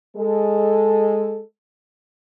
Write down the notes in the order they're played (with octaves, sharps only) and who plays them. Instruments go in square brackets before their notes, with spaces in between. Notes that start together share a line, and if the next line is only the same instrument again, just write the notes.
[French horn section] G#3 A4